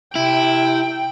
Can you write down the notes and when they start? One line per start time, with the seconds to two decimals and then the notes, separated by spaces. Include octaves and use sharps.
0.15 C3 E4 G5